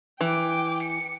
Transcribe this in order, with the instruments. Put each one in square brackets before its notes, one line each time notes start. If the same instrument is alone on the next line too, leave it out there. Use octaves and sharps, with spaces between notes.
[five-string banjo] E3 [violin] G5 D6
[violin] C#7